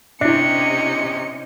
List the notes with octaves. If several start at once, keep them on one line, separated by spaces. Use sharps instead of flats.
C3 C#4 D4 E4 G4 D#5 E5 C#7